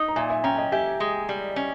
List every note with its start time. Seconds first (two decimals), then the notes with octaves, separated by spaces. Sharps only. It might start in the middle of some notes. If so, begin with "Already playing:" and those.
Already playing: D#4
0.08 A#5
0.16 A#2 E5 G#5
0.30 E5 G#5
0.44 C#4 G5 A#5
0.58 D#5 G5
0.72 G4 E5 G#5
1.00 G#3
1.29 G3
1.56 C#4